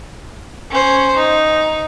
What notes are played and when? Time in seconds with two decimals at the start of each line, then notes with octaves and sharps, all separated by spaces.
0.70 C#4 C5
1.17 D#4